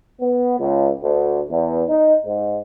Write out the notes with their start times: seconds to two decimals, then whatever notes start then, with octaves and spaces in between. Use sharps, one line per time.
0.20 B3
0.59 C#2
1.03 D2
1.49 E2
1.88 D#4
2.25 G#2